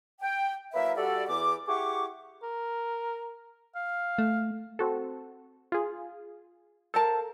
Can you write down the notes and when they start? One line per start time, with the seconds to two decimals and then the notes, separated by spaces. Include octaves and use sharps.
0.22 G5
0.74 F#3 A#3 E4 B4 E5
0.97 G3 F#4 A4 D5
1.28 E2 D6
1.68 E4 G4 G#4 F#5 C#6 D6
2.43 A#4
3.75 F5
4.18 A3
4.79 C4 F#4 A4
5.72 F4 G#4
6.94 A4 A#4 C5 F5 A5